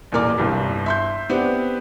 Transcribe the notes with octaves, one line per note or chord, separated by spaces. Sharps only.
A1 E2 A#2 A#4 D5 D6
G1 C2 G2
E5 C6 G6
B3 C4 D4 G4 B4